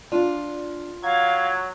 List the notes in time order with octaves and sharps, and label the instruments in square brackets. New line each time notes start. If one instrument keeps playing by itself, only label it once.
[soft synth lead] D4 [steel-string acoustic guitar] F4
[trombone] F#3 [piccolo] F5 [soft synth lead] G#6